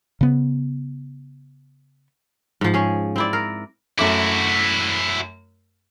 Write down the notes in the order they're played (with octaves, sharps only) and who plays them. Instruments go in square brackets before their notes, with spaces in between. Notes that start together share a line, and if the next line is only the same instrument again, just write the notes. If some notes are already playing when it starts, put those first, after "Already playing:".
[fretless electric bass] C#3 B3
[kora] G#2 F3
C#4 G#4
C4 E4 D5
A#4
[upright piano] F#2 A3 D6 [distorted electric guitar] E4 F#4